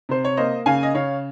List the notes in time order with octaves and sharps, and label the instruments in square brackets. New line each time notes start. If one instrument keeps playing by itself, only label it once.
[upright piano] C3 C5
C#5
A#3 C5 D#5
C#3 F5 G#5
D#5
C#3 C#5 F5